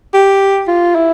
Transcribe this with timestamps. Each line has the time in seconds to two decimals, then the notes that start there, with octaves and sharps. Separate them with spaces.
0.14 G4
0.68 F4
0.95 E4